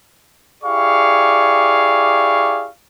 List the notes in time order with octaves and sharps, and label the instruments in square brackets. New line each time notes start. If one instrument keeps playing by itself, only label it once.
[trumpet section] E4 G4 G#4 D5 F5 C#6